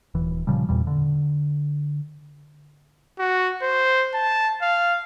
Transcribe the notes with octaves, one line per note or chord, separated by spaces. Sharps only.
D#1 E3
A#2 C#3 F3 G3
E2 A#2 G3
D3
F#4
C5
A5
F5